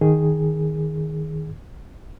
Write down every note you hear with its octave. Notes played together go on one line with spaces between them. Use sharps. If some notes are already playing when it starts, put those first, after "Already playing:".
D#3 G#4